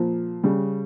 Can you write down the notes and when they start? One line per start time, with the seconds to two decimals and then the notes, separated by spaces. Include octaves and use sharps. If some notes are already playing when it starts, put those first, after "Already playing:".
Already playing: A#2 F3
0.44 C#3 G3